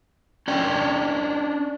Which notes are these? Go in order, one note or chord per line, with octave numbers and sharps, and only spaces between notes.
C#4 D4 D5 G5